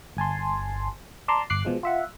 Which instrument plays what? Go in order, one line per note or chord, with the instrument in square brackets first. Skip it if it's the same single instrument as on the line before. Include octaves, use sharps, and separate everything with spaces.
[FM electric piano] G1 G#5 A5 C6
D5 A5 A#5 C6
G1 D6 F#6 C7
B2 F3 G#3
F4 E5 F#5